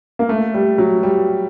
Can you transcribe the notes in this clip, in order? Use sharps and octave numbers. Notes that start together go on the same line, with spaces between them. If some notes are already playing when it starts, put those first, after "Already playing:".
A#3
A3
G3
F#3
G3